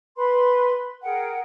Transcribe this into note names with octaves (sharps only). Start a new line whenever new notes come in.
B4 B5 C6
G#4 A#4 F#5 G5